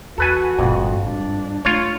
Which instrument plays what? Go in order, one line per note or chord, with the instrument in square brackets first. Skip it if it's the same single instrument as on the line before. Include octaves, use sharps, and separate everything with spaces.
[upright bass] E2 [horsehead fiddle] F#4 [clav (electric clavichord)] A4 B4 G#5
[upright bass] G1 A#2 [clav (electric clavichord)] F2
[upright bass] G#2 G3 [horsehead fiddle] D4
[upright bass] A3 [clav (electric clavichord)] F4 C#5